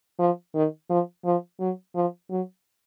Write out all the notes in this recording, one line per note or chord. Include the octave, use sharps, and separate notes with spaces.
F3
D#3
F3
F3
F#3
F3
F#3